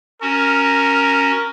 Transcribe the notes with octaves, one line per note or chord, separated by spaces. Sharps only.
C#4 F#4 A#4